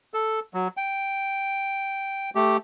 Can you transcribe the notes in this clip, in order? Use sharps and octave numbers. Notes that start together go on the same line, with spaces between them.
A4
F#3
G5
A3 G4